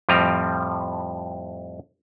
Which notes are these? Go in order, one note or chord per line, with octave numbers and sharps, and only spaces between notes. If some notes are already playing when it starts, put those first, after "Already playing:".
F2 A2 F3 G3 C4 A#5